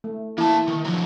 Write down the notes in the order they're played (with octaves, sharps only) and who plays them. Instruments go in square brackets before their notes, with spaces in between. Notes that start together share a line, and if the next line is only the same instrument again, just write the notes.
[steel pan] A3
[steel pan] E3 E4 [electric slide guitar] A#3 A5
[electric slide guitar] D#3
D3 F3 F#3